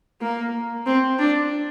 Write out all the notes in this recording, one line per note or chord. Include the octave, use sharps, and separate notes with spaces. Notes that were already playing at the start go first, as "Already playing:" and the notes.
A#3
C4
D4